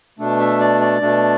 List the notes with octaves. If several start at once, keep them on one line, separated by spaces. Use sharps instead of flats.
B2 A3 D4
E5
D5
D5
B2 A3 D4